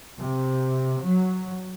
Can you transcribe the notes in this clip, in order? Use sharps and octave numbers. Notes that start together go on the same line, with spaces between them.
C3
F#3